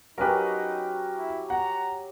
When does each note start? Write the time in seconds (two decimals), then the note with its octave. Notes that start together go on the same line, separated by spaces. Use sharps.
0.18 F#3 C#4 D#4 G4 A#4 B4
1.18 E4
1.50 F#5 A#5